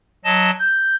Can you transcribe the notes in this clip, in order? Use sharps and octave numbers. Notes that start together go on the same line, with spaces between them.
F#3 D#5 A5
G6